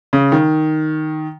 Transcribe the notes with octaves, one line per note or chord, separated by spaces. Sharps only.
C#3
D#3